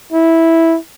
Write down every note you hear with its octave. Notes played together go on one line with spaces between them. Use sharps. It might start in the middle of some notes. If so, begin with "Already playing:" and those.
E4